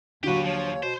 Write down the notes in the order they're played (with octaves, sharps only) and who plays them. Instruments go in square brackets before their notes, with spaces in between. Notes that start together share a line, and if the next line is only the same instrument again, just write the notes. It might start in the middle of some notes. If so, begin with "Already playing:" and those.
[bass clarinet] D#2 [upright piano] D3 F#3 [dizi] F#4 [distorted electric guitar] G4 B4
[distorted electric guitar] F3 [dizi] C#5
[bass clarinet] B2 [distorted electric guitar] C5